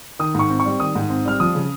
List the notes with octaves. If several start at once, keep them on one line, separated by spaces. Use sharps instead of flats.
D#3 D#6
G#2 C#6
C4
C#6
G3
D#3 D#6
G#2
C4
G3 F6
F3 D#6
C#3